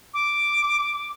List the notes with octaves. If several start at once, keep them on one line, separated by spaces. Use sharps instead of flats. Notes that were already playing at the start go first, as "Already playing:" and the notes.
D6